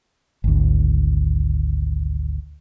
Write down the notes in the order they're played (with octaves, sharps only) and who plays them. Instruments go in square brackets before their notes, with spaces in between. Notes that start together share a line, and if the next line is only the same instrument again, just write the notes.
[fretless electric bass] G#1 D2